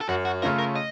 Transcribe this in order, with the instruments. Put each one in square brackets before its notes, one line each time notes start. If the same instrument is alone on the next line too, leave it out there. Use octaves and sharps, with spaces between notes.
[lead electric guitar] A4
[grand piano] F#2 [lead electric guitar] F#4
[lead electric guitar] F#4
[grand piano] C#3 A3 C#4 F4 [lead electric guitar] A#4
[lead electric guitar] A#4
D#5